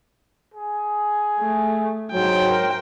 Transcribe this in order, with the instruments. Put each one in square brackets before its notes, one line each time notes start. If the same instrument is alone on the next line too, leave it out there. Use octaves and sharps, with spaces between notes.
[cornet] G#4
[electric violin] A3
[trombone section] G#2 F#3 [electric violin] C5 G5
[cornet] A#4